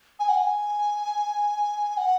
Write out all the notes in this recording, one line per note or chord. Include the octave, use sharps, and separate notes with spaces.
G#5
F#5
G#5
F#5